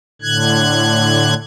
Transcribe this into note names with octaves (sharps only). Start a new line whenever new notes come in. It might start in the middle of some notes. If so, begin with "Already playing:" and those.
A2 D3 F#6 G#6